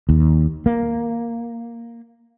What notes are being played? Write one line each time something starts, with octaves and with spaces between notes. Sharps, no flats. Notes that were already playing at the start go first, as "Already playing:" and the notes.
D#2
A#3